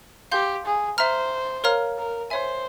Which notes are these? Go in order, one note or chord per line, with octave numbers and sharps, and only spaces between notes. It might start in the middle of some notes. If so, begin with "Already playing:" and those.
G4 F5 C6 G6
G#4
C5 E5 A#5 F6
A#4 C#5 F5 A#5 F6
A#4
C5 C#5 E5 G#5